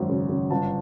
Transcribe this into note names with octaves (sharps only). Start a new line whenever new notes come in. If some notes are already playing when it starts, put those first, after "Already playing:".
Already playing: G#1 F#2
C#3
C#3
G1 A5